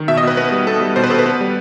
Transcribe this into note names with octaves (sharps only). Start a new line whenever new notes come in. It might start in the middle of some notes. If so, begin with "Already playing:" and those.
Already playing: D#3
B2 E5
D#5
B2 B4
B3 B4
G3
B3 A4
G3
B2 C5
B4
B2 A4
B4
B3
G3